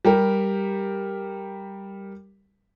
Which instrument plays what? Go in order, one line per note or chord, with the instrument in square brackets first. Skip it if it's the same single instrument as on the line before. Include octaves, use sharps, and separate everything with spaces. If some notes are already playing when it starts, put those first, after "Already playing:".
[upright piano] G3 G4 A#4